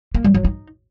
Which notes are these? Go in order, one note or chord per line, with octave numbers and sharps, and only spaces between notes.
A#3
G3
F#3
D#4